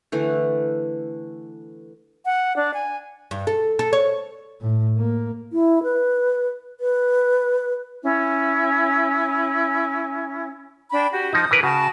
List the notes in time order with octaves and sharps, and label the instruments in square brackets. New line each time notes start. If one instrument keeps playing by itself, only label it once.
[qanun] D3 E3 A3
[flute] F#5
D4
G#5
[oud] G2
A4
A4
C#5
[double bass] A2
A#3
[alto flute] E4
B4
B4
[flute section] C#4 E4
D4 G5 B5
F#4 G4
[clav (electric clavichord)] F3 D#4 [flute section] D#6
[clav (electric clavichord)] E3 A#4 B4
[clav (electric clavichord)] C#3 [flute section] F#4 A5